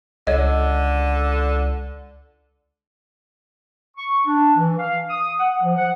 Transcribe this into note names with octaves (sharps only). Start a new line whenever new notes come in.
C#2 D3 C#5 D#5
C#6
D4
E3
F5
D#6
F#5
F3
F#5